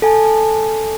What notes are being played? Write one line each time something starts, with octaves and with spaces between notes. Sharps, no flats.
A4 G#5 A5